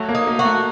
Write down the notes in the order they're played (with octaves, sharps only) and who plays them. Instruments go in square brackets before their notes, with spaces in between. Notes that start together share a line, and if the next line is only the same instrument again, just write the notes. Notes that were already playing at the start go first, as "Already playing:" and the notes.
Already playing: [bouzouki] F#3 [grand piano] A3
[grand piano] A#3
[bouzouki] D#4
[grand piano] A#3
[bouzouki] F#4
[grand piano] A3